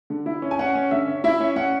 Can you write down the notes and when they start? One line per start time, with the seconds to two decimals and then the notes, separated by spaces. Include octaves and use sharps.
0.10 D3
0.26 E4
0.42 C#4
0.51 G#5
0.59 C#4 F#5
0.76 C#4
0.91 D3 E5
1.08 C#4
1.24 E4 E5
1.40 C#4
1.56 C#4 F#5